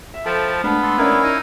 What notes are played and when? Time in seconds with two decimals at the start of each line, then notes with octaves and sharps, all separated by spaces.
0.14 E5
0.26 F3 A4 G5 A5 B5
0.64 G#3 A3 B3 D4 F5 A5 B5
0.83 A4 C6
0.98 C#4 E4 A#4 D5 F5 G#5
1.23 D#4